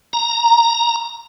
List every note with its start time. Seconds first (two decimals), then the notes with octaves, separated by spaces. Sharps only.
0.13 A#5